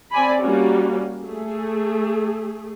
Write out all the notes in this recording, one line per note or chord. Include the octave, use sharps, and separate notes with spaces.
C4 D5 G#5 B5
G3 A#3 C#4 F#4
A3 G#4